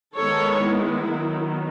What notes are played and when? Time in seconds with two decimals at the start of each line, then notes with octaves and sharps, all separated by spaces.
0.16 D#3 G#3 B3 A4 C#5
0.63 E4
1.09 D#3 F#3 B3